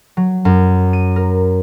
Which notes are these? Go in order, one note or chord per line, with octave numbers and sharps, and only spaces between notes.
F#3
F#2
D#7
A#4